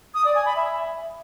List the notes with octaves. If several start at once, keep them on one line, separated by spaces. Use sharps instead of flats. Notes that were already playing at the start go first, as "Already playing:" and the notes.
D#6
D5
G#5
B5
E5